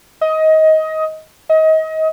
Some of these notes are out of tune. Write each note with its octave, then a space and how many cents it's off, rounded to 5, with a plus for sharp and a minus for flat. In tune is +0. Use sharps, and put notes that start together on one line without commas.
D#5 +20
D#5 +30